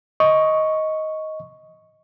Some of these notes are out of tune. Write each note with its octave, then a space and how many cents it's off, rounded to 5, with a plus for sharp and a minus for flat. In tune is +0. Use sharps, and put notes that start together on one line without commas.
D#5 +10 C#6 +0